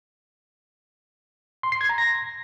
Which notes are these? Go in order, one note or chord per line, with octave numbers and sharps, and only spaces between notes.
C6
C7
G#6
A#5
A#6